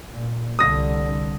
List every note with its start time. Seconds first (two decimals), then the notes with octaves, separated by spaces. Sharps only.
0.13 A#2
0.59 C2 D3 D#6 A#6